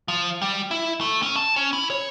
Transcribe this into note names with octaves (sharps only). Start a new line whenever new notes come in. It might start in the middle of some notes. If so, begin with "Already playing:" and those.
F3
G3
E4
A3
C#4
A5
C#4
E4
C#5